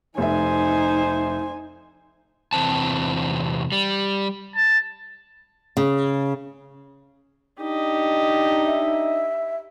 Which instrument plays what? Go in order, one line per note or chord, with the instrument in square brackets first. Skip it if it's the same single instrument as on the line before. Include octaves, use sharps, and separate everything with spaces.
[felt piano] F1 E5 [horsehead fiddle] D#4 [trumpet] C5 [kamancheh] G#5
[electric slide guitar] E2 C3 E3 C4 A5
G3
[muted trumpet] A5
[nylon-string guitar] C#3
[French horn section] D4 D#4 [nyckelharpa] G4 D#5
[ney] E5